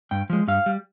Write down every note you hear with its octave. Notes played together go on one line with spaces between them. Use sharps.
G2 G5
F3 G#3
G2 F5
G3